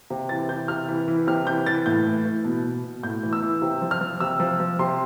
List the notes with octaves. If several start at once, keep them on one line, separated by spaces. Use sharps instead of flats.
C3
E3 A6
E3 G6
C3 F6
E3
E3
C3 F6
E3 G6
E3 A6
A2 G6
E3
E3
B2
B2
B2
A2 G6
E3
E6
E3
C3
F3
F6
F3
C3 E6
F3
F3
C3 C6